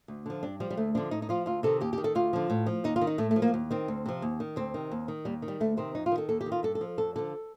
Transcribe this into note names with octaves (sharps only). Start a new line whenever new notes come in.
D2
D3 F3
G2 D4
F3 G3
G3
D2 A3
D3 F3 D4
A2 D#4
D#4
F3 F4
D2 F4
C3 D#3 A4
D#2 G4
G4
D#3
A4
D2 F4
D3 F3
A2
F3
D#2 D#4
F4
D#3
D#4
A2 A3
A3
F3
A#3
D#2
D#3 C4
D2
C3 F3
D#2
D#3
D2 C4
C3 D#3
D#2
D#3
D#2 G3
D#3
G3
D2 A3
C3 D#3 C4
F2 D#4
F4
D#3
A4
D#2 A4
G4
D#3
F4
G2 A4
A4
F3
F2 A4
D3 F3 A4